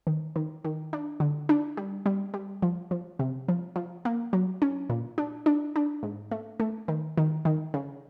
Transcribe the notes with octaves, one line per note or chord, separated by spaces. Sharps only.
D#3
D#3
D#3
D4
D3
D4
G3
G3
G3
F3
F3
C3
F3
F3
A#3
F#3
C#4
A#2
D4
D4
D4
G#2
A3
A3
D#3
D#3
D#3
C#3